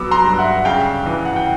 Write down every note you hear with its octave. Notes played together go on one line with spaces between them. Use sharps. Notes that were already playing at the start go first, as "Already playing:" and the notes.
Already playing: F#3 B3 D6 E6
A#5 C6
G2
E5 F#5
C#3 F5 G5
E3
F#5
G5